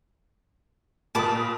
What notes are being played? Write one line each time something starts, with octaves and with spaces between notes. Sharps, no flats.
A#2 A#4 A5 B5 D6 D#6